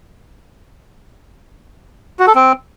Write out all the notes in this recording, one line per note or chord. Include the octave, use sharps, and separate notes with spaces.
F#4
A4
C4